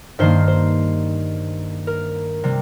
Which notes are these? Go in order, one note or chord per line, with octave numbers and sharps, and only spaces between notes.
G2 D#3 A#3 C5
C5
A#4
C3 G3